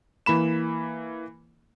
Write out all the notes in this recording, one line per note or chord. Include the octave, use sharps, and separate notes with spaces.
E3 A#3 B5 E7